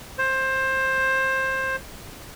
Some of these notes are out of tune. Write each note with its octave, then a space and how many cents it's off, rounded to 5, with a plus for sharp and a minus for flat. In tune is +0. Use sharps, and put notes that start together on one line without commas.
C5 +20